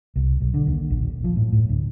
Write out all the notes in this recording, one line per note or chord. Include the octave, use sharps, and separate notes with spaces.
C2
B1
D3
D#2
A#1
D#1
F3
A2
A2
D2